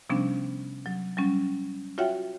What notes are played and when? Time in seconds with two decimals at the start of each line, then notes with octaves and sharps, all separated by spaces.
0.09 C3 F3 G3 B3 C#4 D4
0.86 F#3
1.17 F#3 G3 C#4
1.98 F4 F#4 C#5 E5 F#5 G5